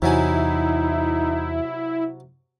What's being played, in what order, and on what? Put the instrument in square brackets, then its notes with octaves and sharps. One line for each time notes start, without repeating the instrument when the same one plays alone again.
[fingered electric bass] E2 [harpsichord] C3 F#3 G#5 [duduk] D#4 [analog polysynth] E4